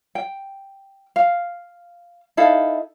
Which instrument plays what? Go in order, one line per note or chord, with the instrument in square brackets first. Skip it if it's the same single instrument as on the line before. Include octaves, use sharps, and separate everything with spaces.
[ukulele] G5
F5
D#4 E4 A4 F5